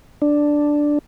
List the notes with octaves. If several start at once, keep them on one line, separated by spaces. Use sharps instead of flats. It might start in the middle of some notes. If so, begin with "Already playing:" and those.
D4